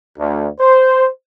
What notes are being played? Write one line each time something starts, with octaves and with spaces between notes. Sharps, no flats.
D2
C5